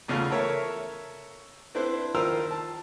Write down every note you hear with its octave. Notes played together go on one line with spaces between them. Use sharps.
E2 C#3 A3 F4 F5
A4 A#4 C#5 E5
C4 D4 E4 B4 C5
D#3 F4 A#4 C5 E6 F6
A5